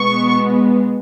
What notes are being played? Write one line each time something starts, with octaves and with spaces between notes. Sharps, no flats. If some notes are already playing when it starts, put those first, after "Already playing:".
Already playing: B2 G#3 B3 C#6